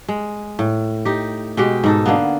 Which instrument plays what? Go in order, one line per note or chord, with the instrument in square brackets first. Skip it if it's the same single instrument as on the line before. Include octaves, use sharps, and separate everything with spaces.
[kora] G#3
A2
D#4 G4
B2 G#3 G4 G5
G#2 D#4 A4
D3 A#3 B3